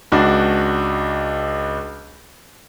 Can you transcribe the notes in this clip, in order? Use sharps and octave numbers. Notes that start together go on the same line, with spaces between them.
C#2 D4 F#4